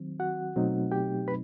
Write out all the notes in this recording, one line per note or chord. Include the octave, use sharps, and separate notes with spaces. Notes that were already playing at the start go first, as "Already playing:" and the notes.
Already playing: D#3 F#3 C4
F#4 F#5
B2 F#3 A3 C4 D#4
G4 G5
B4 B5